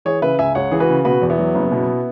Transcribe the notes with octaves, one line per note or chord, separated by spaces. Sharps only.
E3 G#4 C#5
C#3 B4 E5
C#2 E5 G#5
C#2 C#5 F#5
E3 G#4
F#4 B4
C#3
B2 F#4 B4
E2
B3 E4
F#3
F#1
B2